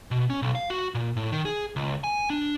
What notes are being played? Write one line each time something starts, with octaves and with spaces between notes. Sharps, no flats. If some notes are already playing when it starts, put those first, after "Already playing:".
B2
C#4
B1
F5
F#4
A#2
A2
D#3
G#4
C#2
G#5
D4